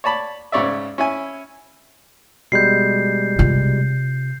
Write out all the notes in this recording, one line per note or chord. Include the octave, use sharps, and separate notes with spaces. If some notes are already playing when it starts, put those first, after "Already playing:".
C#5 D5 A5 B5
G#2 C#3 C#5 D5 E5
C#4 E4 G#5
B2 G3 G#3 G6 C7
C3 F4